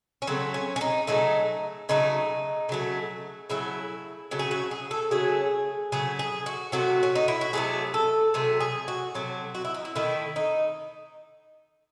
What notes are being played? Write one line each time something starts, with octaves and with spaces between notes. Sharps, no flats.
C#4
C#3 F#3 A3 C4
C#4
C#4
D#4
C#3 F#3 A3 D#4
C#3 F#3 A3 D#4
C#3 F#3 A3
C#3 F#3 A3 E4
C#3 F#3 A3
G#4
F#4
G#4
A4
C#3 F#3 A3 G#4
C#3 F#3 A3 G#4
G#4
F#4
C3 F#3 A3 F#4
C#4
D#4
E4
F#4
C3 F#3 A3 G#4
A4
C3 F#3 A3 G#4
G#4
F#4
C3 F#3 A3
F#4
E4
D#4
E4
D#3 A3 E4
D#4